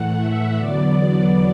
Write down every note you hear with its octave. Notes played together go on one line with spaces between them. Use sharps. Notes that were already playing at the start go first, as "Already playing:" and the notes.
Already playing: A2 E3 A3 F#5
E5
E2 D3 F#3 B3 D5